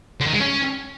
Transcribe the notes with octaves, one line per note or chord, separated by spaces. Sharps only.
D3
D#3
G#3
C#4